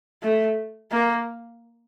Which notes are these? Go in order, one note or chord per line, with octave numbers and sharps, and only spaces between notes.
A3
A#3